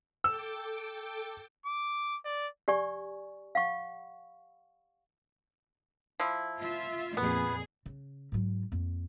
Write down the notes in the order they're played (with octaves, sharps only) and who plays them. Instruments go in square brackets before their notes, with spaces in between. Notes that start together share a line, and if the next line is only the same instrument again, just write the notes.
[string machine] A4 G5 D6 [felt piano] E6
[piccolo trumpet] D6
D5
[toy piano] G4 D5 G#5 C#6
F5 F#5 C#6
[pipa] F3 E4
[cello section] F4 E5
[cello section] F2 A#2 G#4 [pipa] B3
[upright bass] C#3
G#2 F#3
F2 A#3